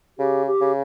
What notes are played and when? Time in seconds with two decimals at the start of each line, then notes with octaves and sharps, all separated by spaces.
0.18 C#3 G4
0.46 G4
0.61 C#3